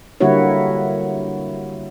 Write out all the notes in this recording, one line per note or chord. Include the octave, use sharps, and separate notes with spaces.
D3 G3 A#3 E4 F#4 C#5